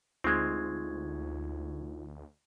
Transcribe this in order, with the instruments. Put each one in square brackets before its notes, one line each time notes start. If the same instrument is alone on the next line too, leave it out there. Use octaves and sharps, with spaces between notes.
[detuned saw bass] D2 [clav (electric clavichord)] G#3 C4 [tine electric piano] D#4 F4 [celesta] C#6 G#6